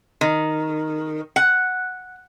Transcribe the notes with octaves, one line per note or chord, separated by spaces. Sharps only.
D#3
F#5